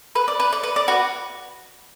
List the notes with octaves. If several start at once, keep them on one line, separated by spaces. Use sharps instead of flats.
B4
D5
B4
D5
B4
D5
F#4 B4